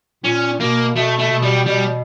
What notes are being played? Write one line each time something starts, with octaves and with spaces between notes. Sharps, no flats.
A#2 C#4
B2 A#3
B2 A3
A3
B2
G3
B2 G3